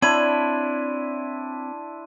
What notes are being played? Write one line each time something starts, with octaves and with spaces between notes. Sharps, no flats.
C4 D4 E4 C#5 A5 B5 C6 D#7